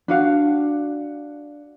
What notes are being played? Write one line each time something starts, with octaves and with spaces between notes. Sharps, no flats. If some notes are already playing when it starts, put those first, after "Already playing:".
D4 F#4 F5